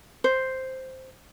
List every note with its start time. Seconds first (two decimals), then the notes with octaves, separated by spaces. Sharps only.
0.24 C5